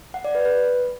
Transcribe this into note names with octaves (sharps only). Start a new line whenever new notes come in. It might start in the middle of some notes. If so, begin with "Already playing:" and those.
F#5
D5
B4
B4